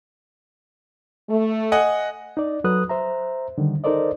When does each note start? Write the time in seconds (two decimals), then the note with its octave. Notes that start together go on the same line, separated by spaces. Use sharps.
1.28 A3
1.72 D#5 F#5 G#5
2.37 D#4 D5
2.64 F#3 A4 B4 D#6 F#6
2.89 C5 E5 A#5
3.58 D3 D#3 G3
3.84 D#4 A4 A#4 C5 D5 D#5